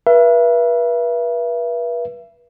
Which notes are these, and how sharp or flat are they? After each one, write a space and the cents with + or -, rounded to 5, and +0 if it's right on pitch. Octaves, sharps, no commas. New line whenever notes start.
B4 -35 E5 +35